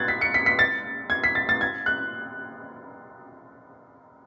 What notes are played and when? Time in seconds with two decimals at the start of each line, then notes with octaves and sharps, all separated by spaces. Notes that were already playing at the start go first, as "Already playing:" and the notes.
Already playing: F#6 G#6 A6
0.08 B6
0.21 C#7
0.34 B6
0.46 B6
0.59 A6
1.10 G#6
1.24 B6
1.35 A6
1.49 A6
1.61 G#6
1.86 F#6